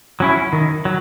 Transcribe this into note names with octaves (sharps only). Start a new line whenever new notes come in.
F#3 C#4 E4
D#3
F#3